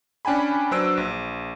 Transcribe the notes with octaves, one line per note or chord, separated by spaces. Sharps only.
C#4 D4 G5 G#5 B5
F#3 D4 B4 C5 E6 D7
A#1